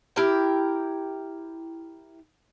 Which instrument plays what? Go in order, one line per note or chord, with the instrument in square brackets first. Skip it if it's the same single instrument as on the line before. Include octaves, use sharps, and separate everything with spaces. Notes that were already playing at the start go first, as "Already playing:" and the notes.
[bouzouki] E4 G4 A#4 G5